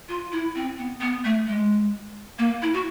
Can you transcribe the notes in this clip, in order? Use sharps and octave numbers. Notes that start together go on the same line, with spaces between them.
F4
E4
C4
B3
B3
A3
G#3
A#3
E4
F#4